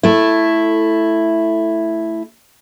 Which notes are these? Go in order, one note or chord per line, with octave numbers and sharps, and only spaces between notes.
A3 E4